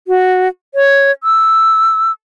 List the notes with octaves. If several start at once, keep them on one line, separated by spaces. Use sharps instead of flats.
F#4
C#5
E6